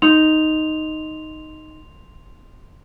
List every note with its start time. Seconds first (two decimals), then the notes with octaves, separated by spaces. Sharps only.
0.02 D#4 C6 F7